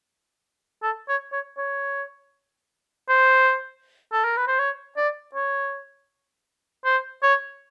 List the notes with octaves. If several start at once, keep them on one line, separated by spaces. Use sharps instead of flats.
A4
C#5
C#5
C#5
C5
A4
A#4
B4
C5
C#5
D5
C#5
C5
C#5